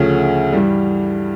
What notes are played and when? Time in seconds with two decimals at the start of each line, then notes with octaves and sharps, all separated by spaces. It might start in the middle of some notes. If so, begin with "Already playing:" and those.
Already playing: D2 C#3 F3 A3
0.52 G2 E3 G3